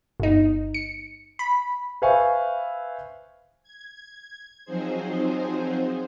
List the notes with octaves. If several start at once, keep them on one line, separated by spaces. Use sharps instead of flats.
G1 D#4
C#7
B5
B4 C5 E5 F5 G#5 C#6
G#6
F3 F#3 C4 D#4 G#4 C5